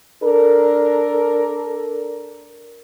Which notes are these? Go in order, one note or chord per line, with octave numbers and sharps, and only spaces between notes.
D4 A4 A#4